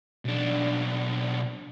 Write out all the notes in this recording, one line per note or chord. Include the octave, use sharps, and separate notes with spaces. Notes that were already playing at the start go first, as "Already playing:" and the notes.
B1 D4